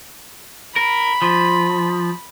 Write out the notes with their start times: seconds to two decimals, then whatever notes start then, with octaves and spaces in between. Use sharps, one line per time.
0.76 A#4 B5
1.22 F3